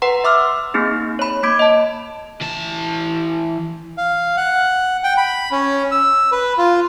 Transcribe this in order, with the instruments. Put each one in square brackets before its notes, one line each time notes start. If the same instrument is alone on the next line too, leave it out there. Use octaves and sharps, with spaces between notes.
[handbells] B4 F#5 A#5 C6
E5 C6 D6 E6 F6
A#3 C4 D#4 G#4
C#5 B5
A#3 B5 D6 G#6 D7
D#5 A5
[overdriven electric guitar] E3 A5
[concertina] F5
F#5
G5
B5
C#4
E6
B4
F4